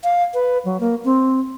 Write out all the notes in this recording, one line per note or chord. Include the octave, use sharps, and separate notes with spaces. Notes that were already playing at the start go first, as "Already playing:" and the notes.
F5
B4
F#3
A#3
C4